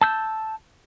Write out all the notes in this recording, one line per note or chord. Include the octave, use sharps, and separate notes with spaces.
A5 E6 G6